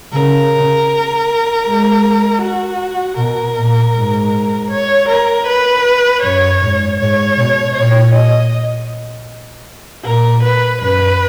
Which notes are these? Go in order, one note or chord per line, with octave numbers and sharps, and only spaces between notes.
C#3 A#4
G#3
F#4
B2 A#4
A#2
G#2
C#5
A#4
B4
F#2 C#5
G#2
G#2 C#5
B2
A#2 C#5
D#5
A#2 A#4
B4
F#2 B4